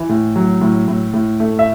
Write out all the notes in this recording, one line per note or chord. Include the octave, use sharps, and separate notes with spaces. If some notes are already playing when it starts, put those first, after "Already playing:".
Already playing: E3
A2
F#3
A2
A2
A2
A3
E5